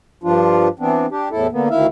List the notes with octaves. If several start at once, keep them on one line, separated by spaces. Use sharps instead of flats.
G2 F3 D4 F4
E3 B3 C4 D4
D4 G4
E2 A2 E4 A4
D3 A#3 B3
D2 D#3 E4 E5 F5